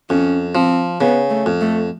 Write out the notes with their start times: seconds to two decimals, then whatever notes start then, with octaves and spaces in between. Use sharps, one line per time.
0.10 F2 C#4
0.55 F3 C4
1.00 C#3 B3
1.30 A3
1.46 F2
1.61 A3